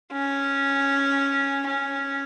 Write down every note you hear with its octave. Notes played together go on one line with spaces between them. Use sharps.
C#4
C#4